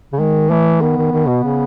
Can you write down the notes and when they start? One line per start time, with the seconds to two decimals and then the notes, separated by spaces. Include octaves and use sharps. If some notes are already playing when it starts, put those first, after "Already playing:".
0.13 C#3
0.19 D#3 G#3
0.50 E3 A3
0.81 D#3 B3
0.97 D#3
1.12 D#3
1.28 B2
1.43 C#3